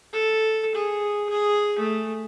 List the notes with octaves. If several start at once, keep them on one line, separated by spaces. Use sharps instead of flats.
A4
G#4
G#4
A3